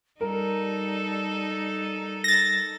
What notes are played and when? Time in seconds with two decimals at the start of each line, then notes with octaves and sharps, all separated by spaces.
0.21 G3 D#4 A4 A#4
2.24 A6 A#6